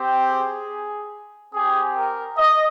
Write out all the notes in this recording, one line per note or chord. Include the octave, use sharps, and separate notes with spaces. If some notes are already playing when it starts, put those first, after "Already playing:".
Already playing: C4 G4
G#4
C4 G4 G#4
A#4
D#5